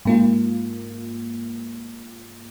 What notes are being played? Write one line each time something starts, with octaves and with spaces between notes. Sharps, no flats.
G#2 A#3 F4